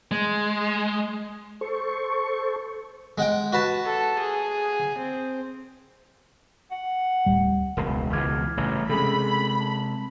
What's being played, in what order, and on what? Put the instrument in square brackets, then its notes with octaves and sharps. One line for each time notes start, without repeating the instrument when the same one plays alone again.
[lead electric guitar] G#3
[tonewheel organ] A4 C5 C#6
[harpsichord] G#3 F#5 G5
F#4 B4 A5
[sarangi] A4
G#4
C4
[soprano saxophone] F#5
[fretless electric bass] D1 G3
[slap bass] E1 C#2 [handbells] A#4
[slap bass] C#2 B2 E3 [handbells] D6 F6 G#6
[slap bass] A1 G2 C#3
[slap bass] C3 G#3 [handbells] C#4 G#4 A4 [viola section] B5
[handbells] A5